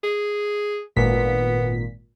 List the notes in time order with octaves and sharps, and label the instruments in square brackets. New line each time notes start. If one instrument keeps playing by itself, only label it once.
[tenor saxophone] G#4
[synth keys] G#1 A#2 B6 [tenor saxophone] B3